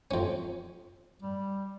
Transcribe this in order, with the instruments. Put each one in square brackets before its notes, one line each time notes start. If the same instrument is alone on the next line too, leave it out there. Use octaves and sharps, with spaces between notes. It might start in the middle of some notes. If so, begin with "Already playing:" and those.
[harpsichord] F2 C#4
[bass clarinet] G3